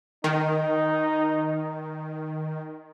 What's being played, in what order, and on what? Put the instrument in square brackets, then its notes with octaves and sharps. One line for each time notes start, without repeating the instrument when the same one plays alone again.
[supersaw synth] D#3 [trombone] D#4